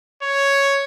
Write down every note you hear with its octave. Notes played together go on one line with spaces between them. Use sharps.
C#5